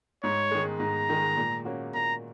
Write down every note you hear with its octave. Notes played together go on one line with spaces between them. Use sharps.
G#2 C#5
D#3 G#3
G#2 A#5
D#3 G#3
A#2
A#3 C#4 F#4
A#2 A#5